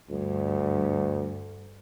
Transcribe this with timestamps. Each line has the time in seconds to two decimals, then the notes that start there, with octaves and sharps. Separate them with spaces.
0.10 D2 G2